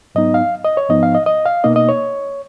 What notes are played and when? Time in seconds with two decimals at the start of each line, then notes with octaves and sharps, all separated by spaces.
0.15 G#2 F#3 B3 D#4 D#5
0.34 F5
0.65 D#5
0.77 C#5
0.89 G#2 F3 B3 D#4 D#5
1.03 F5
1.15 D#5
1.26 D#5
1.46 F5
1.64 B2 A#3 D#4 D#5
1.76 D#5
1.89 C#5